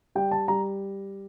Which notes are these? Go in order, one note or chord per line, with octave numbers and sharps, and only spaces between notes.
G3 G5
A5
G3 A#5